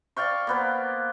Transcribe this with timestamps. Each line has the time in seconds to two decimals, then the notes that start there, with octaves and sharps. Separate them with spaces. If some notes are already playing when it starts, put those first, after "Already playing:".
0.16 D5 F5 G5 C#6
0.47 A#3 B3 C5